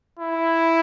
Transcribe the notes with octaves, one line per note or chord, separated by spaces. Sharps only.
E4